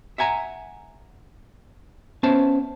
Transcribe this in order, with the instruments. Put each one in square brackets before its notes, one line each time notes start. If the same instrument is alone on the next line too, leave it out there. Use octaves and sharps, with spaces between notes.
[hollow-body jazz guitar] E5 F#5 G#5 A#5
B3 C#4 C5 E5 A5